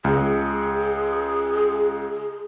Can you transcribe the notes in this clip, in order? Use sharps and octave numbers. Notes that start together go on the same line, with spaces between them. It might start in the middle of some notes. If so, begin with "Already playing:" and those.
C#2 G#4